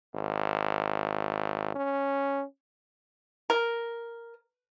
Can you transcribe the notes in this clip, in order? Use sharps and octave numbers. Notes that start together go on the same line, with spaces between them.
G#1
C#4
A#4